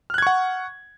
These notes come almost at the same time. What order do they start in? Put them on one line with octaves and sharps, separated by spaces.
F6 F#6 G#6 C#6 F#5